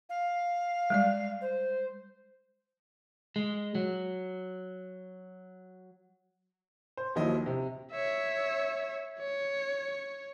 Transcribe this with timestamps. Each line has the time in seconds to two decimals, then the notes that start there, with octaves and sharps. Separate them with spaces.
0.09 F5
0.90 G3 G#3 D5
1.41 C5
3.36 G#3
3.75 F#3
6.97 C5
7.15 D#2 D#3 F3 F#3 E4 D#5
7.46 C3
7.92 C#5 E5
9.19 C#5